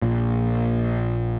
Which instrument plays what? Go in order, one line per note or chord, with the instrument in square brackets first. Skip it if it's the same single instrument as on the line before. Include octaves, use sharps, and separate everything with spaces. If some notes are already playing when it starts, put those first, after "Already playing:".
[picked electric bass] A#1 A#2